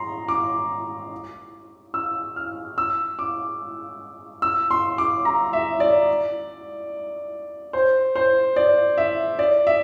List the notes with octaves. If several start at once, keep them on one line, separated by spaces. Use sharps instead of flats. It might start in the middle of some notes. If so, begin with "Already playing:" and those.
Already playing: A#5 C6
D6
E6
F6
E6
D6
E6
C6
D6
A#5
E5
D5
C5
C5
D5
E5
D5
E5